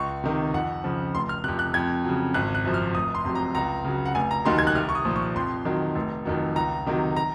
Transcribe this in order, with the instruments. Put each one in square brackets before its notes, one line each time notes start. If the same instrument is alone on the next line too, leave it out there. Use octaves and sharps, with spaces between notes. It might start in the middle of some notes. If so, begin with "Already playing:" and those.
Already playing: [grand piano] C#2 C#6
C3 D#3
F2 F#5
C#3 F3
F1 C6
F6
C3 F#6
F2
F#6
F2 G#6
C#3 F#3
G#1 F#6
F#6
F#2 F3
F6
F1 D#6
C6
F2 C3 F#3
A#5
C#2 A#5
C#3 F#3
F#5
F1 G#5
A#5
D#2 D#3 F#3 C6
G#6
F#6
C2 F6
C#6
D#6
A#2 F3
C#6
F2 C6
D#3 F#3
F1
F2 D#3 F#3
C#2 A#5
C3 D#3 F#3
A#5